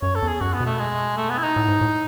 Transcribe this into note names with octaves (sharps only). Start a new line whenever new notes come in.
F#2 C#5
A4
E2
G#4
F#2 F#4
B3
B2
A3
G#3
A3
B3
E4
D#4
A2
G#2
A2